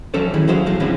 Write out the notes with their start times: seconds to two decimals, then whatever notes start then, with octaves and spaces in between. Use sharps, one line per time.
0.14 E3 F#3 C#4 A4 C5 D5
0.34 D#3 E3 E4 G#4
0.48 F#3 G#4 C5 E5 F5
0.66 E2 A2 G#3 F5
0.80 D3 E3 F3 G3 C4 C#4